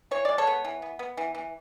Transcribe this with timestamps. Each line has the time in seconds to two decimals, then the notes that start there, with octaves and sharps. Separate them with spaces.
0.11 E3 C#5
0.25 G#3 D5
0.38 A4 C#5
0.47 B3
0.65 E3
0.82 B3
0.99 B3
1.17 E3
1.35 E3